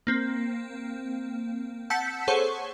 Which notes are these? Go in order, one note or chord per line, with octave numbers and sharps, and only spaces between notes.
A#3 C4
F#5 A5 E6 G6 B6 C#7
G#4 A4 C5 C#5 F#5 C#6